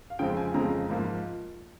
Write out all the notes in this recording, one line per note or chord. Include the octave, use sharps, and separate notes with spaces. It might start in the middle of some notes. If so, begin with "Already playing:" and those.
F5
F2 C#3 F3 G#3 C4 G5
G#5
F2 C#3 F3 G#3 C4 A#5
G#2 F3 A#3